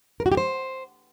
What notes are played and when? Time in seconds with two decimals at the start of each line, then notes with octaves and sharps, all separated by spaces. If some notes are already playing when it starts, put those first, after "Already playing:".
0.20 A#4
0.26 F#4
0.32 G4
0.37 C5